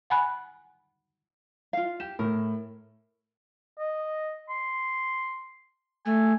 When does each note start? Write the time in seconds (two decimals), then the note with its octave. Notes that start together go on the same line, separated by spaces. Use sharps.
0.10 F#5 G#5 B5 F#6
1.73 F4 F5
2.00 G4 E7
2.19 A2 A#4
3.79 D#5
4.49 C6
6.06 A3 G#5